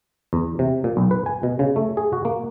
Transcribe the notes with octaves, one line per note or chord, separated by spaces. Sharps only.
E2
C3
A#2
B1
B4
G#5
B2
C#3
A3
G#4
F#4
A#3